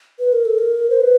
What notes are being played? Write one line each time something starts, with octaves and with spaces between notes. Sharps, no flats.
B4
A#4
A4
A#4
C5
B4